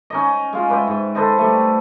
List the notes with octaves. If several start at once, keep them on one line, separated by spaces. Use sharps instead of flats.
C#4 D#4 D#5
G#3 F4
B4 D5 E5 G5
G#2
A4 B4 C5 D#5
G3 A3